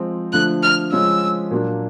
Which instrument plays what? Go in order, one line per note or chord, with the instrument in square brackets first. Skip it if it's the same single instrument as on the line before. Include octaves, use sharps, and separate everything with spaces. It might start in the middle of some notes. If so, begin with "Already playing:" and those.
Already playing: [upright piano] F3 G#3 C4
[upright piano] D3 F3 A3 [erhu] F#6
[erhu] F6
[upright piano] C#3 F3 G#3 C#4 [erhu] E6
[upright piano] A#2 F#3 A#3 D4